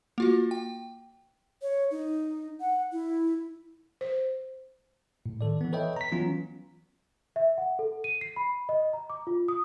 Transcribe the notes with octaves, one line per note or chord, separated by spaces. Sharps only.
A#3 F4 F#4
G5
C#5
D#4
F#5
E4
C5
A2
D#3 A4 D5
E3 B3
A4 B4 C#5 D#5 E5 G5
A#5 B6
E3 F#3 B3 C#4 F4
E5
F#5
A4
D#7
C7
B5
D#5
A#5
D6
F4
D#6